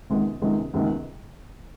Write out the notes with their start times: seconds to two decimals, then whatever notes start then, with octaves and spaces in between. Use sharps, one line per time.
0.10 C#2 C3 D#3 G#3 B3
0.42 C#2 C3 D#3 G#3 B3
0.74 C#2 C3 D#3 G#3 B3